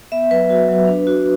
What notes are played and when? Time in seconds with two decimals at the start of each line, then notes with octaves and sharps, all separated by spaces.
0.12 B3 E5
0.31 F#3 B4
0.50 F#4
0.69 F#3
0.87 D4
1.07 F#4